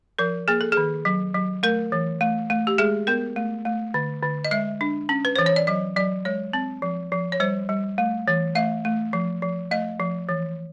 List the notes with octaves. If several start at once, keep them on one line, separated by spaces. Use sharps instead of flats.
F3 A#4
A#3 G#4
A4
G#4
D#3
F#3
F#3
A3 A#4
E3
A3
A3
G4
G#3 G#4
B3 A#4
A3
A3
D3
D3
D#5
G#3 E5
D4
C#4
B4
E3 C5
C#5
D5
F#3 D#5
F#3 D5
G#3 C#5
C4
F3
F3
C#5
G3 C5
G3
A3
E3
A3 E5
A3
F3
F3
A3 D#5
F3
E3